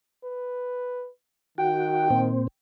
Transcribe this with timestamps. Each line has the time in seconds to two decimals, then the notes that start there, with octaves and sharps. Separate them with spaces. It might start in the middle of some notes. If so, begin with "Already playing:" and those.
0.25 B4
1.58 D#3 F#4 G5
2.10 A#2 C4